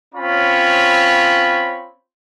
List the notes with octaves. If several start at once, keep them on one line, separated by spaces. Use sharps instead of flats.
C4 C#4 F4 C#5 B5